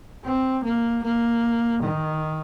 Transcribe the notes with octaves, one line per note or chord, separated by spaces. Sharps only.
C4
A#3
A#3
D#3